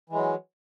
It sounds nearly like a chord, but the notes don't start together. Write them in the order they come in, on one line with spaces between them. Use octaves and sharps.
E3 G#3 F#3